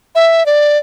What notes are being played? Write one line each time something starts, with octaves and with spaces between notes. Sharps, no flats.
E5
D5